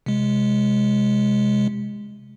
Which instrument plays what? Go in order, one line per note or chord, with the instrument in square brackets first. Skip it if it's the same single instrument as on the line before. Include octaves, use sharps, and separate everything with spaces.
[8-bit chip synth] C3 G#3